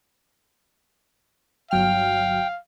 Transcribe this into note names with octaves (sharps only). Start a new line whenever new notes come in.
G1 F#3 F5 G5 F6